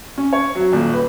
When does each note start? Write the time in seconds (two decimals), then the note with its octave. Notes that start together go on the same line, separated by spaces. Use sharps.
0.18 C#4
0.33 C#5
0.55 F#3
0.73 D#1
0.93 B4